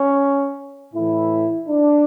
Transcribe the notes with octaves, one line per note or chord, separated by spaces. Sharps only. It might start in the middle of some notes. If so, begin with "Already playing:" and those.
Already playing: C#4
A2 E3 E4
D4